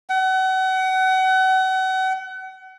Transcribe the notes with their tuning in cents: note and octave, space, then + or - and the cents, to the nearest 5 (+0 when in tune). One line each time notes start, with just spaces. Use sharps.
F#5 +35